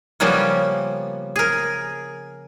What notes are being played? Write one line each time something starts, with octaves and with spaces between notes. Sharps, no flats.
C#3 F3 G3 A#3 B3 C#4
G#4 A#4